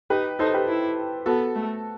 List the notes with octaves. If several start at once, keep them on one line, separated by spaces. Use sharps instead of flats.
D#4 G4 B4
D#4 A4 C5
G4 B4
E4
B3 F#4 A4
A3